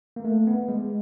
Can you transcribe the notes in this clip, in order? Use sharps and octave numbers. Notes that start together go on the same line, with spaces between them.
A#3
A3
B3
G#3